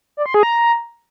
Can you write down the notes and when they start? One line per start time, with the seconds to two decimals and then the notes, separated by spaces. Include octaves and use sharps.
0.17 D5
0.26 C6
0.34 G#4
0.43 A#5